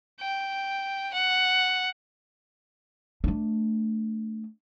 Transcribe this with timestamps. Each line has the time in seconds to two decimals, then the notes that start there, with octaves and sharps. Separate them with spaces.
0.20 G5
1.13 F#5
3.24 A3 D4